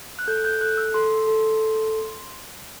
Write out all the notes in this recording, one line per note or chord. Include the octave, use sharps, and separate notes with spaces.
F#6
A4 G6
G6
A4 F#6
E6
A4 C6
A4